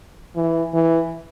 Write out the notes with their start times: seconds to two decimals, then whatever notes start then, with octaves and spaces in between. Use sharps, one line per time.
0.36 E3
0.74 E3